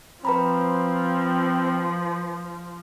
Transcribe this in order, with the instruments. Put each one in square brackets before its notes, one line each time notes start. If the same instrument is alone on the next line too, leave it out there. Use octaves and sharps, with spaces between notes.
[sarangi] F3 [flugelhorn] C4 [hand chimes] B4 A#5 B5